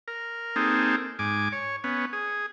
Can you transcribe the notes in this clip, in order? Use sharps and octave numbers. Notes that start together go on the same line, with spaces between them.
A#4
A#3 C4 D#4 G#4 A4
G#2 G#5 D6
C#5
B3 C#4
G#4